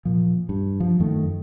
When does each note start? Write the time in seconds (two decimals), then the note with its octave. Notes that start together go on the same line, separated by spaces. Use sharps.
0.05 A#2 F3
0.49 G2
0.80 F3
1.00 F#2 D#3 A3